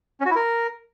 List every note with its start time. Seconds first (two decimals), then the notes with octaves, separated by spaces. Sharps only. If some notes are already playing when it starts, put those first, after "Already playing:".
0.20 C#4
0.25 F#4
0.31 E4
0.36 A#4